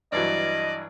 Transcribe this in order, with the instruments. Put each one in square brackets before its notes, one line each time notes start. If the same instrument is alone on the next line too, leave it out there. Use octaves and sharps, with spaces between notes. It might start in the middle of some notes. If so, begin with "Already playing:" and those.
[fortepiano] G2 E3 F#3 [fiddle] D5 [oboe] D#5